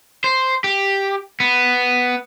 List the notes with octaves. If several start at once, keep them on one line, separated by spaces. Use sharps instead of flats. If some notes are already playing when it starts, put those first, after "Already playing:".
C5
G4
B3